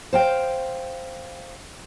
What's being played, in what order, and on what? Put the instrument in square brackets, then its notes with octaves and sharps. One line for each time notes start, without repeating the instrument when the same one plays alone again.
[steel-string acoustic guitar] C5 F5 G5